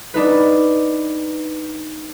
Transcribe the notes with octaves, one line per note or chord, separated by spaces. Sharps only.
D4 D#4 B4